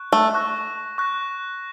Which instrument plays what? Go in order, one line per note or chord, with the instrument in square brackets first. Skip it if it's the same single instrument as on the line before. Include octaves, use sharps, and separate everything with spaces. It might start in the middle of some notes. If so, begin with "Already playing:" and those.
Already playing: [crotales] C#6 F#6
[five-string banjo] A3
[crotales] C#6 F#6 A#6
C#6 F#6 A#6